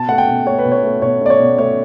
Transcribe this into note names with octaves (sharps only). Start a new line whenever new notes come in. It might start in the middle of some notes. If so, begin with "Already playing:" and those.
Already playing: B2 A5
A3 F#5
G5
B2
A3 C#5
B4
B2
C#5
A3
B2 C#5
A3 D5
C#5
B2
A3 C#5